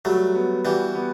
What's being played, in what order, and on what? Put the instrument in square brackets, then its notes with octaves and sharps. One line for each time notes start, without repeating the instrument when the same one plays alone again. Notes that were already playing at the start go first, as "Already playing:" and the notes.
[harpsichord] F#3 A3 [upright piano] G3
[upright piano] B3
[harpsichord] E3 G3 [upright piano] F#4
[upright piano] B3